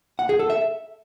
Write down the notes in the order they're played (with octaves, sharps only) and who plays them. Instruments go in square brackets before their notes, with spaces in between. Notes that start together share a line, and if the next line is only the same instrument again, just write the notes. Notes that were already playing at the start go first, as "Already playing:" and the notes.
[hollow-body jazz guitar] F#5
G#4
A4
E5